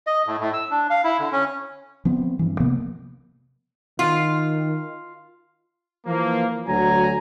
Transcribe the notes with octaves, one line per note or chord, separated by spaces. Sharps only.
D#5
A2
A2
E6
D4
F5
E4
D3
C#4
F3 B3 C4
G2 E3
C3 F3 A#3 B3
D#3 F4
E3 F3 A#3
D2 F#3 G#5 A#5